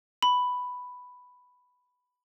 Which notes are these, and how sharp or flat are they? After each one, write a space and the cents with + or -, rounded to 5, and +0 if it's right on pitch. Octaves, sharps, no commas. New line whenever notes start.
B5 +5